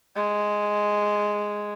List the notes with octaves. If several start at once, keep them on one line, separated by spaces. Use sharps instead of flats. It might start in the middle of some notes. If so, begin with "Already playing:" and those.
G#3